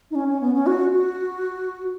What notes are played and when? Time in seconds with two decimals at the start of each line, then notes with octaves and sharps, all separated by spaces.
0.11 D#4
0.15 C#4
0.28 C#4
0.41 B3
0.54 C#4
0.66 F#4
0.93 F#4